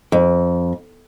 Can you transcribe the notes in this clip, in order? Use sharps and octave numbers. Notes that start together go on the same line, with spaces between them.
F2